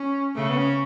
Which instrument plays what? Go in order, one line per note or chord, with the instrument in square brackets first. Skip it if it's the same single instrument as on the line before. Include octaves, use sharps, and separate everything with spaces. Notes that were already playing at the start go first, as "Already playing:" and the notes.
Already playing: [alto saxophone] C#4
[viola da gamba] C#3 [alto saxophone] A3
[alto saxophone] B3
C#4